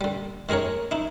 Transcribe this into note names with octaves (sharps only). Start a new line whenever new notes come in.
D3 G3
D#3 G#3 G#4 A#4 C#5
D#4 E4